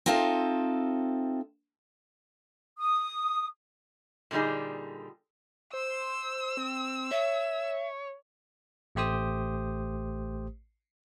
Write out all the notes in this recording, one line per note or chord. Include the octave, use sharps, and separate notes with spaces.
C4 D#4 F4 A4 E5
D#6
A#2 D3 G3 D#4 G#4
C5 E6
C4
C#5 E5
A1 A3 G4 C5 D#6